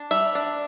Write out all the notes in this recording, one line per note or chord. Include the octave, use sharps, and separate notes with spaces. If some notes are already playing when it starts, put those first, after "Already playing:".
Already playing: D4
G3 E5
D4